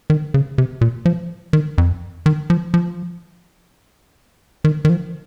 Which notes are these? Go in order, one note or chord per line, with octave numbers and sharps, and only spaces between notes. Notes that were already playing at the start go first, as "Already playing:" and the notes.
D#3
C#3
C3
A#2
F3
D#3
F2
D#3
F3
F3
D#3
D#3
F3